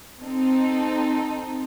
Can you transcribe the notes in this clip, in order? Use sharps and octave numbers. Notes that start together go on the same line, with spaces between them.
C4 D#4 A4